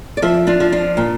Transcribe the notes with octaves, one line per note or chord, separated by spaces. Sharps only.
D5
F3 C5 E5
D4 F4
F3
D4 F4
A#2